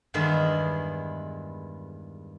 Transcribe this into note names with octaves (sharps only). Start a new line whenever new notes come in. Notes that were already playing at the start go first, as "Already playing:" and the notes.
E2 G2 D#3 G#3 B3 E4